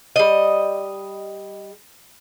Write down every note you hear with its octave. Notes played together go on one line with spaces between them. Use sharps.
G3 D#5